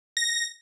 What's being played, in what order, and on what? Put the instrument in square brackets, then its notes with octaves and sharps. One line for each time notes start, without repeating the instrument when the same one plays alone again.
[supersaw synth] A#6